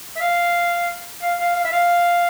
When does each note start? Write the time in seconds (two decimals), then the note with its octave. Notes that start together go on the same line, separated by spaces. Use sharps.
0.16 E5
0.21 F5
1.22 F5
1.40 F5
1.56 F5
1.64 E5
1.72 F5